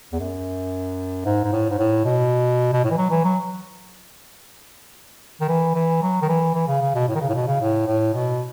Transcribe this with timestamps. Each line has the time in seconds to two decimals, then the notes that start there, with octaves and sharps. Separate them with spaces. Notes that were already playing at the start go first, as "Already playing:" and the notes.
0.12 E2
0.19 F#2
1.25 G#2
1.44 G#2
1.52 A2
1.70 G#2
1.79 A2
2.05 B2
2.73 B2
2.84 A2
2.91 E3
2.97 F#3
3.11 E3
3.24 F#3
5.41 D#3
5.49 E3
5.75 E3
6.03 F#3
6.22 D#3
6.29 E3
6.54 E3
6.68 C#3
6.82 C#3
6.95 B2
7.08 A2
7.15 D#3
7.21 C#3
7.29 A2
7.34 B2
7.47 C#3
7.61 A2
7.87 A2
8.14 B2